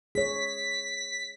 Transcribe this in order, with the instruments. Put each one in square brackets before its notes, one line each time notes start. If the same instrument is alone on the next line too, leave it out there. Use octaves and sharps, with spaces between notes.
[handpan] G#4 C#5 [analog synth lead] B6